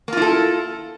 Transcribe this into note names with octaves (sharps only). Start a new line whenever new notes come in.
A#3 E4 F4 A4